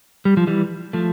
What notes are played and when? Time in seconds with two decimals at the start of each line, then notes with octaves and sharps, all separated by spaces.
0.25 G3
0.37 F3
0.47 E3 G3
0.93 F3 A3